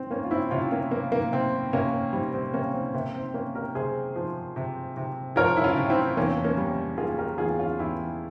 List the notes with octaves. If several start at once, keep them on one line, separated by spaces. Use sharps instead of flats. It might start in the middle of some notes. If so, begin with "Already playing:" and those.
Already playing: C4
A#3 C#4
F4
C4 E4
C3 C#4 F4
A#3 C#4
A#3
A#3
C3 C4
C3 A#3 C#4
G3 C4
C4
C3 A#3 C#4
C4
C3 A#3
C4
A#3 C#4
G4 A#4
C3 G#4 C5
F3
C3
C3
F3 A#4 C#5
E4
C#4 F4
C3
C4 E4
E2 A#3 C#4
A#3 C#4
G3
A#3 F4 G#4
G4 A#4
E2 F4 G#4
C#4 F4
E2 E4 G4